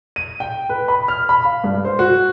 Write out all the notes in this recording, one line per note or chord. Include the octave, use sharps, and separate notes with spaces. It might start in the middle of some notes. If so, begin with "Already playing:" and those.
D#7
G5
B4
B5
F6
B5
F5
G2
C5
F#4